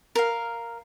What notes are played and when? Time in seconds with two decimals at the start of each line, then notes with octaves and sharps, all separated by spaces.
0.15 A#4 F5